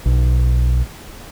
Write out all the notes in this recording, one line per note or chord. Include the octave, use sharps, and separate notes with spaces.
B1